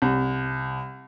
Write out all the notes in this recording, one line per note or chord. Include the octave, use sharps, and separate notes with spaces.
C2